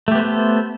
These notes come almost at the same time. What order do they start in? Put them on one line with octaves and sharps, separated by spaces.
A3 G4 B3 C5 A4